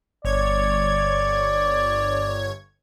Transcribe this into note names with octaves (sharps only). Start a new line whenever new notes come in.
G1 C#5 D5 G#6